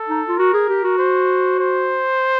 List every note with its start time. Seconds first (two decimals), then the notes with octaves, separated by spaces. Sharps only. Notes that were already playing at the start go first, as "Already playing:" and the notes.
Already playing: A4
0.08 D#4
0.28 F4
0.38 F#4 A#4
0.53 G#4
0.69 G4
0.84 F#4
0.98 C5
1.59 C5